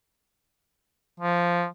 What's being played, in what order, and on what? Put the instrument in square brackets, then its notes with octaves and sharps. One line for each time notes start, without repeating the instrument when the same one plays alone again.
[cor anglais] F3